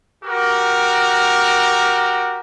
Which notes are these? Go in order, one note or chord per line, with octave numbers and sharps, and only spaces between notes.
F#4 G4 A#4